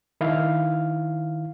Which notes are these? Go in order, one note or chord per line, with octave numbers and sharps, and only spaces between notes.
D#3 E4 F5